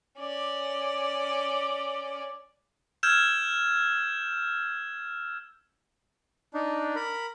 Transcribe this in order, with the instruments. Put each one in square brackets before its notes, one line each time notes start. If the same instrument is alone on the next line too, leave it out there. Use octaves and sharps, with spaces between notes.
[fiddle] C#4 D5
[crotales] E6 F6 G6 G#6 E7
[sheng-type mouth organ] D4 D#4
A#4 B5